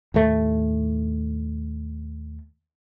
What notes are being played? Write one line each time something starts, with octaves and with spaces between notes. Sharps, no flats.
D#2 A2 A3